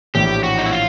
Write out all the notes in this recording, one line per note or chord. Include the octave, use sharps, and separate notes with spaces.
A#1 A2 E3 G4
F#4
D#4
E4
F4